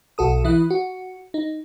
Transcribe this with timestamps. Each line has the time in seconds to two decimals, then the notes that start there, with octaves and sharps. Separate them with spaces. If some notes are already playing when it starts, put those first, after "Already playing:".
0.18 B1 F#4 A4 D#6
0.44 E3 E4 D#6 F#6
0.70 F#4
1.34 D#4